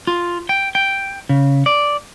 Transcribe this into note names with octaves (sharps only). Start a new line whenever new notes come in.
F4
G5
G5
C#3
D5